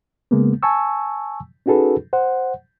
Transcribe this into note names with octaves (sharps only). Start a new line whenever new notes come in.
C#3 G#3 A#3 B3
G#5 A5 C#6 E6
C#4 D#4 F#4 G#4 A4 B4
C5 F#5